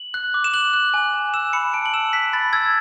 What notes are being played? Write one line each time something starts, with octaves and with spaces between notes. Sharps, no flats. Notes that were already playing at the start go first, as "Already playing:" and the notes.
Already playing: F#7
F#6
D6
E7
F#6 F#7
F#6
G#5
G#5
E6 E7
B5 C#7
A5 D7
F#7
E6 E7
F#6 B6
B5 A6
E6 G#6